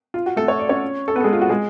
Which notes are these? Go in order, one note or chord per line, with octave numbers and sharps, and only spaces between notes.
F4
F#4
A3 A4
C#5
D5
C#4 C#5
A4
B3 B4
A4
G#3 G#4
F4
F#4
G#3 G#4